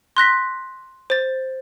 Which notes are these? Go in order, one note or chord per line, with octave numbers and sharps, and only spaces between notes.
C6 F#6 A#6 B6
C5 A6